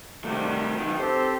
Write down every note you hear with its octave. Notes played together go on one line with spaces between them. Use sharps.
C3 D#3 G3 A3 F#4
D#3 F#3
C4 G4 A4 C5